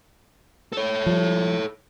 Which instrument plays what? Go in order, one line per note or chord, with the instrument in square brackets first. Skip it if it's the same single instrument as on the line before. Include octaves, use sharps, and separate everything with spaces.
[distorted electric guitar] A4 C#5
[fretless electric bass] F3 G3